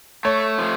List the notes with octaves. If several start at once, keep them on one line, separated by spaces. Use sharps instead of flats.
A3 C#5
F3